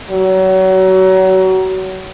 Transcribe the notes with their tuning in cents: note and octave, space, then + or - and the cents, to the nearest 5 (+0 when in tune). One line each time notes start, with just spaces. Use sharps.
F#3 +30